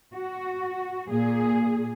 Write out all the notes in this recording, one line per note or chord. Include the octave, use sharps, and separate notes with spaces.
F#4
A#2 G#4